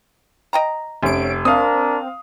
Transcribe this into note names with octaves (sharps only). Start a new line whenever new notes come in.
D#5 G5 A#5
F1 C#4 D7
C4 D4 A#4 F5 D#6